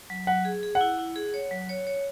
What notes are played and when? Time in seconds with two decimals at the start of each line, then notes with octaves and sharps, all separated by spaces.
0.10 F#3
0.27 F#3 F#5
0.45 G#4
0.63 G#4
0.75 F#5
0.81 E4
0.99 E4
1.16 G#4
1.34 C#5
1.51 F#3
1.69 C#5
1.87 C#5